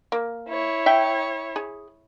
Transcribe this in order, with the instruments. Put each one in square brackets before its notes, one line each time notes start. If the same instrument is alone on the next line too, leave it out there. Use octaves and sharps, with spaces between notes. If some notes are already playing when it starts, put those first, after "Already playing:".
[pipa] A#3
[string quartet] E4 C#5
[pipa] E5 G5
G#4